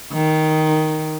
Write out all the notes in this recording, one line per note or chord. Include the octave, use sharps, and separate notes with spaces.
D#3